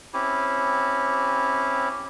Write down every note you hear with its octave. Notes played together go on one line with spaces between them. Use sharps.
C4 C#4 E4 G4